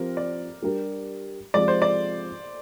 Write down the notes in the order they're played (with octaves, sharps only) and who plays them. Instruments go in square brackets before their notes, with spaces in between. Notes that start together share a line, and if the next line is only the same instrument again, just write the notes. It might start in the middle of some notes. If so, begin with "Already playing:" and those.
Already playing: [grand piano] F3 C4 G4 [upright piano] A#4
[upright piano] D5
[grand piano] G3 D4 G4 A#4
[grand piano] C3 F3 G#3 [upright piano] D5
[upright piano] C5
D5